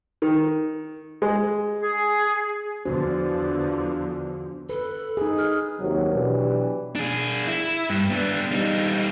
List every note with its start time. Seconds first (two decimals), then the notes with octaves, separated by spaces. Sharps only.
0.22 D#3
1.22 G#3
1.81 G#4
2.85 E2 D3 F3 D4 F#4 C5
4.69 A4 B4
5.17 D#4 G#4
5.37 F6
5.80 D#2 C3 F#3
6.13 B2 E3 F#3 D4 G4
6.95 D4 G#4
7.48 E4
7.90 G2
8.10 B3 D4
8.52 G3 D#4